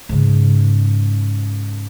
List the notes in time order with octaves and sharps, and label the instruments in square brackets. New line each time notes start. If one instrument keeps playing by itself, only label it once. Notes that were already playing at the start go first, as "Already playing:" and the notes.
[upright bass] G#2 C#3